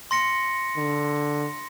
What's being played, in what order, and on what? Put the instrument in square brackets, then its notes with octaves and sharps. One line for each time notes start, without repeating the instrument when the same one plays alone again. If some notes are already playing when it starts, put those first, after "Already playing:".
[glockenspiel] C6 A#6 C#7
[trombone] D3